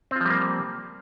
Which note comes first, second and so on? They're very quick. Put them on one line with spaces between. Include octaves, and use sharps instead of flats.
C4 F4 F3 G3 A#3